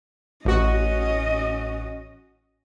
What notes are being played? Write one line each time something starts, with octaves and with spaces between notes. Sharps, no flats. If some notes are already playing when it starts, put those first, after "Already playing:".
A1 C#4 F#4 D#5